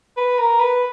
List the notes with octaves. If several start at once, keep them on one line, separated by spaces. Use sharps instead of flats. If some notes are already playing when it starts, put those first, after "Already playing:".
B4
A#4
B4